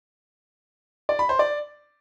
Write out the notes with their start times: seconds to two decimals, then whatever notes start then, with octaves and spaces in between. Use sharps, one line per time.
1.09 D5
1.19 B5
1.29 C5
1.39 D5